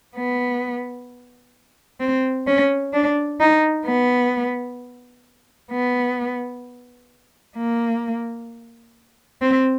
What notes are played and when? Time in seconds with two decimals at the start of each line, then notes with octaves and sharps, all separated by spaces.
0.16 B3
2.01 C4
2.47 C#4
2.93 D4
3.40 D#4
3.86 B3
5.72 B3
7.57 A#3
9.42 C4